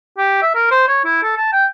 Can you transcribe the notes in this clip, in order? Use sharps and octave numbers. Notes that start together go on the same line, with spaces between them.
G4
E5
A#4
C5
C#5
E4
A4
A5
G5